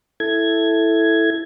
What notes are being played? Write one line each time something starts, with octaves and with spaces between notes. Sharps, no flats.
E4 A4 G#6